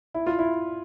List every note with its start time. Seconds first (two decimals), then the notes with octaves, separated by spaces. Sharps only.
0.14 E4
0.27 F4
0.39 E4